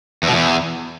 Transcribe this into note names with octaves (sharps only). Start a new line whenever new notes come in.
E2
B2
E2